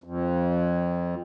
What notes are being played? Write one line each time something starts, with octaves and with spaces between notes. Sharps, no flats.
F2